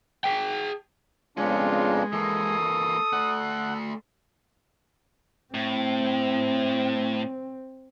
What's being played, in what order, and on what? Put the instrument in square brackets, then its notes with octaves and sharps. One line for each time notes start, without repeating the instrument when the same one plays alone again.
[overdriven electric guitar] G#4 G5
[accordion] F2 C#3 D4 [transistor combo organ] G#3 [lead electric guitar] B3 C#4 [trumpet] F4
[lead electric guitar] E3 A#3 [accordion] A4 [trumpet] D#6
[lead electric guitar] A3 D5 [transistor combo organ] F#5
[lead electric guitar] A2 [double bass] C4